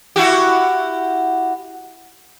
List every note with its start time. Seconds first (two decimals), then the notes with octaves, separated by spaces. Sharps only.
0.16 E4 F#4 G4